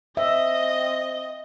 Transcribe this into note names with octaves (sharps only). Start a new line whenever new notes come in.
C4 D#5 E5